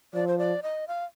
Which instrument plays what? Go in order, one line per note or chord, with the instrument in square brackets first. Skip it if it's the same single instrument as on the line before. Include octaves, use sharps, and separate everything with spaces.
[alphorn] F3 [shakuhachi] D5
[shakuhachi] C5
D5
D#5
F5